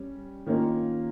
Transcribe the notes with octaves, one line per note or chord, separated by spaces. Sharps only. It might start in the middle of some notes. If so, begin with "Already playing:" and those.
Already playing: G3 C#4
D#3 A#3 C#4 F4